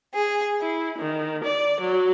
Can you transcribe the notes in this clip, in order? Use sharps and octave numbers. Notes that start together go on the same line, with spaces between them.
G#4
E4
D#3
D5
F#3